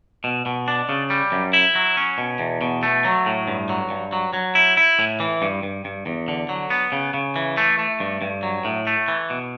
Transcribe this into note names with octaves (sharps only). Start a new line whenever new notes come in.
B2
B2
D4
C#3
G3
F#2
E4
F#3
C#4
B2
E2
B2
A3
F#3
A2
G2
F#3
G2
F#3
F#3
E4
E4
A2
E3
G2
G2
G2
E2
D3
F#3
B3
C#3
C#3
E3
A3
A3
G2
G2
F#3
A2
A3
E3
B2